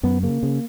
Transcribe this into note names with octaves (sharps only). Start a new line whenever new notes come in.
F#2 B3
C#3 A#3
C#3